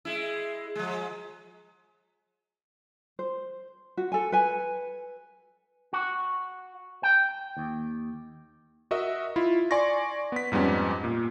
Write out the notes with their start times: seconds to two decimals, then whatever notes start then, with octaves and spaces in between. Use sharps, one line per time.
0.05 G#3 E4
0.76 F3 G#3
3.19 C5
3.97 F#4
4.12 A4 G#5
4.32 B4 G#5
5.93 F#4
7.03 G5
7.57 D#2
8.91 F#4 A#4 D#5 E5
9.36 E4 F4
9.71 D5 G#5 C6 C#6 A#6
10.32 B3 B6
10.52 F2 G#2 G3 B3 C#4
11.04 A#2